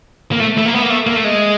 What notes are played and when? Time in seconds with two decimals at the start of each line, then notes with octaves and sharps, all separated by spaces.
0.32 A#3
0.40 A3
0.57 A3
0.65 A#3
0.74 B3
0.82 A#3
0.90 A3
1.07 A#3
1.16 A3
1.24 G#3